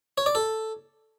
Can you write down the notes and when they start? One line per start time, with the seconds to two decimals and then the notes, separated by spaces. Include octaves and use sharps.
0.18 C#5
0.26 D5
0.35 A4